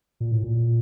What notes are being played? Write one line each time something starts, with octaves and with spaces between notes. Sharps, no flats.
A#2
A2
A#2